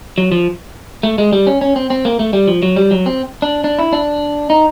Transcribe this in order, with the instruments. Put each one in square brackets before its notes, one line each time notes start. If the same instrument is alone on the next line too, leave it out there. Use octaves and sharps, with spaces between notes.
[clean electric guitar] F#3
F3
A3
G#3
G3
C#4
C#4
C4
C4
A#3
A3
G3
F3
F#3
G3
F#3
C4
D4
D4
E4
D4
D#4